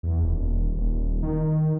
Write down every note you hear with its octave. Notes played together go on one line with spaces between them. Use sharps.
E2
D#1
D#1
D#3